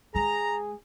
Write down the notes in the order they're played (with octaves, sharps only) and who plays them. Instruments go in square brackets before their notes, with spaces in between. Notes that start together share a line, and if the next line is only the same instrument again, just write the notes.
[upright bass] G#3 [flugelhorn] G#4 [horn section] A#5